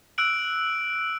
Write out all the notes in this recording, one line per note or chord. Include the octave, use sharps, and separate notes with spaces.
E6 F#6 D7 F#7